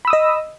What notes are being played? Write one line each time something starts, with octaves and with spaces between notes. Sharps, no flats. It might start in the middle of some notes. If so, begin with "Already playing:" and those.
D#5 B5 D#6 E6